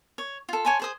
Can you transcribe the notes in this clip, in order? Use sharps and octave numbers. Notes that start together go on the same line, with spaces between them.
C#5
F4 A4
C#5 G#5 A5 C6
G#4 C5 D#6